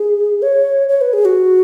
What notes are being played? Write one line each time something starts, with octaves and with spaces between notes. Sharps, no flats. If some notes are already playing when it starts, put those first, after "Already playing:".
Already playing: G#4
C#5
C#5
B4
G#4
F#4